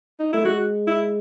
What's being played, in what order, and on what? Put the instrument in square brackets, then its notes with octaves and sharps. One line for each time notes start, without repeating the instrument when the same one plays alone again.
[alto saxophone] D#4
[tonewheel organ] A3 [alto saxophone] E4
[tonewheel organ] G#3 [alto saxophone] F#4
[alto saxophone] E4